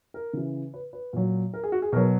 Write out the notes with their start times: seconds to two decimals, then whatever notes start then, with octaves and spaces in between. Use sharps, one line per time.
0.14 A#4
0.33 C#3 E3
0.74 B4
0.93 B4
1.13 A#2 F#3
1.54 A#4
1.63 G#4
1.72 F#4
1.82 G#4
1.92 B2 A#4
1.96 F#3